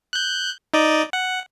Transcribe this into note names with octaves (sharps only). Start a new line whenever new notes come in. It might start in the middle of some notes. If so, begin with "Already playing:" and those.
F#6 G6
D#4 D5 D#5
F#5